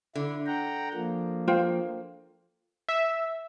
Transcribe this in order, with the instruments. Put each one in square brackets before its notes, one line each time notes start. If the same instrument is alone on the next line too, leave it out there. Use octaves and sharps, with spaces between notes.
[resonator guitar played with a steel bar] D3 [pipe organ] E4
[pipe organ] F#5 G5 A#5
F3 A#3
[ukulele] F4 C5 G5
[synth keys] E5